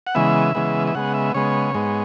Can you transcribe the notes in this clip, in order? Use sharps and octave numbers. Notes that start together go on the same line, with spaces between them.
F#5
C#3 E3 G#3 B3 E5
C#3 E3 G#3 B3
E5
C#3 G#3 B3 F#5
E5
C#3 G#3 B3 C#5
G#2 G#3 B3